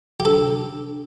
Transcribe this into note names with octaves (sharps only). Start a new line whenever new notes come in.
G4
D4 A4